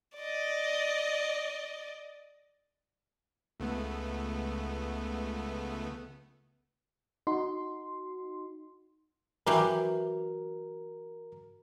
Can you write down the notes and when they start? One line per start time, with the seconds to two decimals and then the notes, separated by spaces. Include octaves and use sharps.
0.18 D5 D#5
3.60 C#2 A3 B3
7.27 D#4 F#4 C6
9.47 E3 F#3 G4 A#4